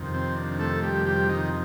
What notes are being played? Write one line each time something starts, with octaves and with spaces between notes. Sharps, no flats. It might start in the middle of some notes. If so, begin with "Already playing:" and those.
Already playing: F2 C3 D#3
C4
D4
A3 A4
G3 G4
G3 G4
D#3 D#4